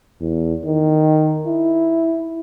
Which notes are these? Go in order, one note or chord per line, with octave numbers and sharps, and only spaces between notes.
E2
D#3
E4